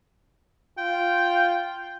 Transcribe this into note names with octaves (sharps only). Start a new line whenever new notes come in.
F4 G5